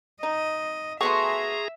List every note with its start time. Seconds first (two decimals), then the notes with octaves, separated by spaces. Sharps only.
0.23 D#4 D#5
1.01 A3 B3 F#4 G#4 E5 A#5 C6 C#6